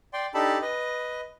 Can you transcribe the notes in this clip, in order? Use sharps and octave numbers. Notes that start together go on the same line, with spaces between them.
D5 G5 C6
D4 D#4 G4 A4 A5 B5
B4 D#5